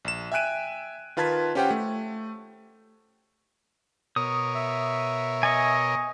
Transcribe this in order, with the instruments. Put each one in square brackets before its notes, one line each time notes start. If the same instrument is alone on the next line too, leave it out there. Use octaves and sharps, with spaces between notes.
[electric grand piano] A#1 E7
E5 G5 G#5 F#6 D7 D#7
D#3 F4 B4 A5 G#6 B6
C#4 F4 G4 C5 F#5 G5
A3
[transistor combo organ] B2 A#4 C#5 [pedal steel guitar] D#6
[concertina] E5
[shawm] D#5 [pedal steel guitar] G#5 C#6